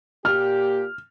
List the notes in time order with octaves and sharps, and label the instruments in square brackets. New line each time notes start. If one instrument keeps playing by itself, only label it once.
[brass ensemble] A#2 G4 [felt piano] F6